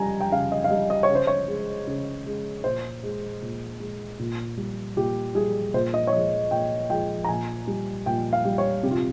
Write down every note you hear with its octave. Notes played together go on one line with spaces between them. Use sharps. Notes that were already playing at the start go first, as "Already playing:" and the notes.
Already playing: C#3 G3 G#5 A#5
G5
C#3 F5
D#5
F5
G3 D#5
D#5
C#5
C#3
C5
C#5
G#3
C#3
G#3
A#2 C5
G#3
A#2
G#3
A#2
G3
A#2 G4
G3 G#4
A#2 C5
D#5
C#5
F3 G#3 D#5
A#2 G5
F3 G#3 G5
A#5
A#2 G#5
G3
A#2 G5
F5
G3
C#5
C3 G4
F4